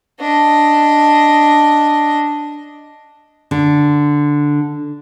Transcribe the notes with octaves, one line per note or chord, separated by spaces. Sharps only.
D4 D#5
D3